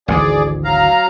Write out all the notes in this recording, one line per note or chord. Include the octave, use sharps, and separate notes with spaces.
G#1 D2 E3 G#4 D5
F#3 F5 A#5